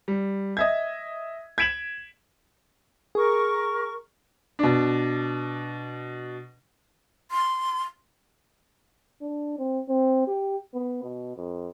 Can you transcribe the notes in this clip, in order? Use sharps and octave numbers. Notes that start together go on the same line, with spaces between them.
G3
D#5 E5 G#6
G#6 B6 D7 E7 F#7
G#4 A#4 C#6
B2 D4
C6
D4
C4
C4
G4
B3
B2
F2